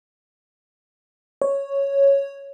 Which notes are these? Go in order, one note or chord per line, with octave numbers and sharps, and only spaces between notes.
C#5